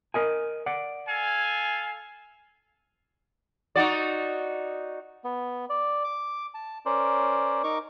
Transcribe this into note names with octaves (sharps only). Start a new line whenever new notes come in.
A#4 D#5 G#5
D5 F#5
A4 F5 G#5
D#4 F#4 D5
B3
D5
D6
A5
C#4 A#4 C5 D5
D#4 A#4 C#6 D6